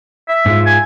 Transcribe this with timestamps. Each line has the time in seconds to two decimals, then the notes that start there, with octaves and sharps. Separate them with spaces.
0.29 E5
0.46 G#2 G#3 F4
0.66 G#5